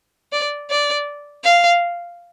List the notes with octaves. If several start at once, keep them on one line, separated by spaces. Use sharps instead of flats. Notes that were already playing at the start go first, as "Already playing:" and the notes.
D5
D5
F5